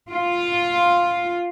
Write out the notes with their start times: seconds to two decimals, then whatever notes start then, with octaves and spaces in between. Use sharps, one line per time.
0.12 F4